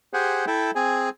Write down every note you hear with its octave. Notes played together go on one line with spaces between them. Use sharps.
G4 G#4 C5 F#5 G#5
E4 A4 E5 G5
C4 G#4 G#5